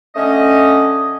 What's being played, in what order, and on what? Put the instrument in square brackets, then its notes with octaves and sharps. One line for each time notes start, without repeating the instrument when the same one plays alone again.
[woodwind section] D3 A3 C#4 D#5